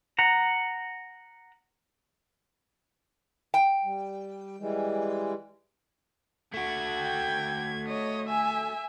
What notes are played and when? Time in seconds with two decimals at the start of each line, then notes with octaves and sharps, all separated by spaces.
0.19 F#5 A#5
3.54 G5
3.84 G3
4.60 E3 G3 G#3
6.54 A3 F#4 G#6
6.98 G5
7.88 C#5 D#5
8.29 E5 G#5